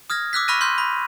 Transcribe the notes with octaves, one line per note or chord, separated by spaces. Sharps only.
D#6 F6 G#6 A#6
D6 E6 F#6 B6
B5 C#6 F6 F#6 A#6 D#7
C6 F6 G6
B5